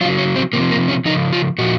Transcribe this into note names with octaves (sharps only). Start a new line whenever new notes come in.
C#3 F#3 F4
C#4
C4
C3 F3 A#3
A#3
C#4
C#3 F3 D#4
F4
A#2 F3 F#4